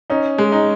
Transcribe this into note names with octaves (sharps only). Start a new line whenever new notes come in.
C#4 D#4
G#3
D#4